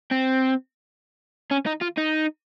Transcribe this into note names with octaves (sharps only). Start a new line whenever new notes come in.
C4
C#4
D#4
F4
D#4